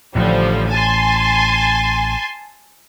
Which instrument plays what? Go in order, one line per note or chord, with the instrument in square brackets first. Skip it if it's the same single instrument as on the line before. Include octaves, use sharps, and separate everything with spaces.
[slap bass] A1 A2 [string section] D3 F3 G3
[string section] G#5 A5 C6